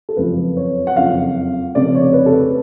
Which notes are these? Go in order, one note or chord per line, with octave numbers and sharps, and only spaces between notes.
A4
F#1 F2 F3 B4
C#5
F#5
F#1 F2 F3 F5
F1 F2 C#3 D5
C#5
B4
A4
B4